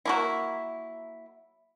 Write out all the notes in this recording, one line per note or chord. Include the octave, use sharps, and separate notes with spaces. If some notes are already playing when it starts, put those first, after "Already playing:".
F#3 A#3 E4